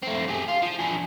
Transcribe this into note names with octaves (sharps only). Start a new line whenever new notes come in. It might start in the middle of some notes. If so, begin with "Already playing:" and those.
A3 C4
G4 G#4
F4
F3
D4 G#4